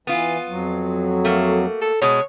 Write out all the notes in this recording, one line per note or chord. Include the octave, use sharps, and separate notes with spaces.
E3 B3 F4
F2 F#3
A3 A#3 F#4
A4
B2 G#3 C#5